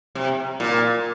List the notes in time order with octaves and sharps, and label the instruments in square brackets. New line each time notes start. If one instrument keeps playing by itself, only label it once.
[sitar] C3
A#2